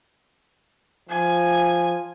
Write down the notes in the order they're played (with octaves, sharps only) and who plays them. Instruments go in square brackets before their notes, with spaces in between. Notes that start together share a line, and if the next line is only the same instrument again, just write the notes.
[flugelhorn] F3 [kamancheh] G#5